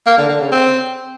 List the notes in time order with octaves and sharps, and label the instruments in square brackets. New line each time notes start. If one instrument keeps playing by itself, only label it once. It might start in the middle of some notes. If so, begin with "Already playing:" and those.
[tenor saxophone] A#3
D3
D3
C#3
C4